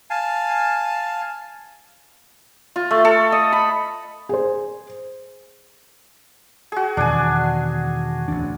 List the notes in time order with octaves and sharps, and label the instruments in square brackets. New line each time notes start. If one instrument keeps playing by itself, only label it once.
[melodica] F5 G#5 A5
[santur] F4
A3
A4
D#5
B5
[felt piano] G#4 C5
[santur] F#4 G#4
[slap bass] E2 B2 D#3 [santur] D4 G#5
[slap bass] A1 D2 D4